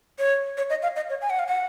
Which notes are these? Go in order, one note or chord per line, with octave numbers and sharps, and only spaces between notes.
C#5
C#5
D#5
F5
D#5
C#5
G#5
F#5
F5
F#5